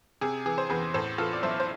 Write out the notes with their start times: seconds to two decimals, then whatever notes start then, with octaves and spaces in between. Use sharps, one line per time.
0.21 C3 G#4
0.46 E3 G#4
0.58 C5
0.70 E2 G#4 B4
0.94 A2 A4 C5
1.18 E3 F4 A4
1.33 D5
1.43 B1 C5 E5
1.60 C5